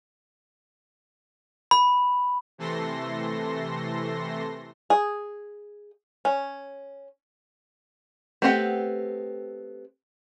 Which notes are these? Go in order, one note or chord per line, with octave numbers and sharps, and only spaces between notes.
B5
C3 E3 A3 A4 C6 A#6
G#4
C#4
A3 B3 C4 G4 F#5